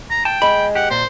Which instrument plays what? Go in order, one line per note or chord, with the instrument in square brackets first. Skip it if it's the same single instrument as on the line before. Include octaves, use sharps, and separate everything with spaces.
[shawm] A#5
[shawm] G5 [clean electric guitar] A5
[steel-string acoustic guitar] G#3 [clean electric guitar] B5
[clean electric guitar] G4 [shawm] F#5
[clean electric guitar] A#2 [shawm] C5